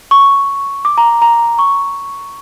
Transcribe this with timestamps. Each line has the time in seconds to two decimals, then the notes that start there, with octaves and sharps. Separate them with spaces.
0.11 C#6
0.85 D6
0.98 A#5
1.22 A#5
1.59 C#6